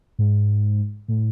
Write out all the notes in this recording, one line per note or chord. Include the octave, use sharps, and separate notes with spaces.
G#2
A2